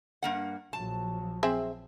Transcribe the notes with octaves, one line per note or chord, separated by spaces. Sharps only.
G2 A#3 F#5
A#1 F3 F#3 A5
C4 G#4 E5